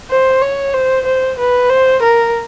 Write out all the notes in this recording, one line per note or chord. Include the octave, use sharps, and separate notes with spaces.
C5
C#5
C5
C5
B4
C5
A#4